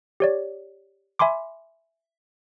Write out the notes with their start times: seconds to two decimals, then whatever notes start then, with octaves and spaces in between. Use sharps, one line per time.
0.20 G4 C#5 D5
1.19 E5 G#5 B5 C6 D6